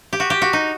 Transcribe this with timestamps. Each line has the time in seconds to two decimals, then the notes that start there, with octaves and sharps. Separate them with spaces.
0.13 G4
0.20 F#4
0.30 G4
0.42 F#4
0.53 D#4